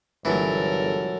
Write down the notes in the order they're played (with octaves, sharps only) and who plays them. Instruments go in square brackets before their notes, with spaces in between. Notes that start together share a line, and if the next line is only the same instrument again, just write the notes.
[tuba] G1 [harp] B2 F#3 G#3 [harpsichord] E3 [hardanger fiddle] A4 A#4